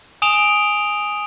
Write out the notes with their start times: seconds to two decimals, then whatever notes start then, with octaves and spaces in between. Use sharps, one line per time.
0.22 G#5 D#6 D7 E7 F7 G7